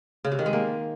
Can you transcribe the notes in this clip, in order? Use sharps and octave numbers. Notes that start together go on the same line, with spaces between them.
C#3
C3
D#3
G#3
A#3